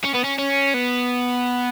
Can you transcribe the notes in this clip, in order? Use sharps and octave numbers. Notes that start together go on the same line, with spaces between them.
C#4
B3
C#4
C#4
B3